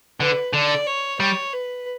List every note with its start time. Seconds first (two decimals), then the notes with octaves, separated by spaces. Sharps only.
0.20 D3 B4
0.53 D3 D5
0.86 C#5
1.20 G3 C#5
1.53 B4